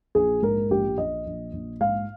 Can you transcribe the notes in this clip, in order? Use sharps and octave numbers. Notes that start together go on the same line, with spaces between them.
A#1 G#4
G#2 A#4
A#1 G4
A#1 D#5
A#1
A#1
G#2 F5